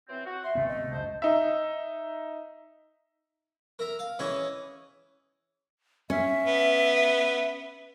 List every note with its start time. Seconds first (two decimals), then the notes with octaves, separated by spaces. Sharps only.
0.09 E3 F#3 C4
0.26 F#4
0.44 E3 E5 C6
0.55 G#1 G2 C3 A3 B3
0.68 D#5
0.91 C#2 F#2 C3 A4 C5
1.22 D#4 E5
3.79 A#4 E5 A#5
3.99 F5
4.19 E3 C#4 G#4 D#5 E5
6.10 C#4 E5
6.46 B3